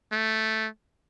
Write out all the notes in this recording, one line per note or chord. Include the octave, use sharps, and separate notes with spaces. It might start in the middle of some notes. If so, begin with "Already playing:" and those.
A3